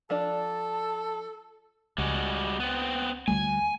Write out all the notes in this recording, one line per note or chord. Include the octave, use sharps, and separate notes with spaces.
F3 D4 A4 D5 A5
C#2 G3 G#3 F#4
B3 C4
D2 G3 A3 G#5